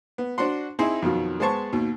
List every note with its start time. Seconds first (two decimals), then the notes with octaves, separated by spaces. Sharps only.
0.18 B3
0.38 D4 F#4 C5 F#5 C6
0.79 C4 D#4 E4 G#4 C5
1.02 F2 B2 D#3 F#3
1.40 G#3 B3 C5 A5 C#6
1.72 D#2 B2